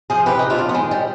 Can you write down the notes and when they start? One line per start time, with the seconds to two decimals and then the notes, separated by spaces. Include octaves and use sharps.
0.10 F3 G#4 C5
0.26 C3 G4 B4
0.39 F2 D#4
0.50 D4 F4
0.59 F2
0.69 B3
0.74 D#3 G#3
0.91 G3